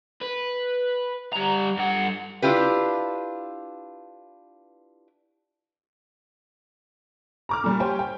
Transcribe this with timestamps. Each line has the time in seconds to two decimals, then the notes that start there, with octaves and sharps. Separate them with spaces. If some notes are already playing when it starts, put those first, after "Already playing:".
0.21 B4
1.33 G3 A#5
1.77 G2 F#5
2.42 D4 E4 F4 G4 B4
7.49 A#5 D6 F6
7.64 A#2 G3
7.80 G4 C5 C#5 G5 G#5
7.99 G5